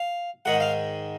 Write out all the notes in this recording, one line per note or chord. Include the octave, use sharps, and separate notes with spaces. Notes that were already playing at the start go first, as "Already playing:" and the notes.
Already playing: F5
G#2 D#3 F#5
F5